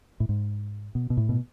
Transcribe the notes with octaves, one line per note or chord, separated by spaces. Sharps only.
A2
G#2
B2
B2
A2
B2